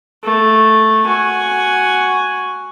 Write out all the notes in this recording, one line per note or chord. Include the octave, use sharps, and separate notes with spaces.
A3
F#4 G#5